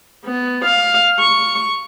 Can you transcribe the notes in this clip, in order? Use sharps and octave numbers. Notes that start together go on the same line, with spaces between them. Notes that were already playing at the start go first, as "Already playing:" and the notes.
B3
F5
C#6